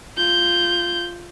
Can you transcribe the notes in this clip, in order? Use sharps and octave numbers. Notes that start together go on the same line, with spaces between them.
F4 G6